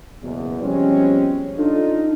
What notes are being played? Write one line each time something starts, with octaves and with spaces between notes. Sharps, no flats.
F#1 E2 B2
B2 F3 G3 G#3 C4 C#4
D4 D#4 F4 A4